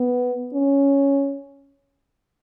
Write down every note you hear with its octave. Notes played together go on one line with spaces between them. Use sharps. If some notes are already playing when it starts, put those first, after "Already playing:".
Already playing: B3
C#4